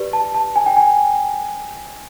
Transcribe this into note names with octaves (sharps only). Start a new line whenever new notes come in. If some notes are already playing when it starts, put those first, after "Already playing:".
Already playing: G4 B4 D5
A5
A5
G#5
G5
G#5